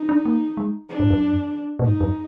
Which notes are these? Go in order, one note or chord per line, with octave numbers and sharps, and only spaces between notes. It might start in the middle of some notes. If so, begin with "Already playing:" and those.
Already playing: D#4
D4
A#3
G#3
D4
G#2
F#2
A#2
G#2 D#4
F#2